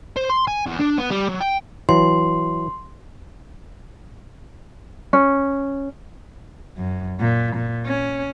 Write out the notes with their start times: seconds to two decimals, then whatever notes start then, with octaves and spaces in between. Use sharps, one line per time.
0.16 C5
0.30 C6
0.47 G#5
0.66 E2
0.79 D4
0.98 B3
1.10 G3
1.28 F#3
1.40 G5
1.89 E3 F#3 C6
5.13 C#4
6.77 F#2
7.20 A#2
7.55 A#2
7.86 C#4